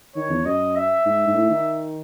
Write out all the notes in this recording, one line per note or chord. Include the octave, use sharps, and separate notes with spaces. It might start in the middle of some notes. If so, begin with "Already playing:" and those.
D#3 C#5
E2
F#2 D#5
E5
G#2
G#2
A2
D#3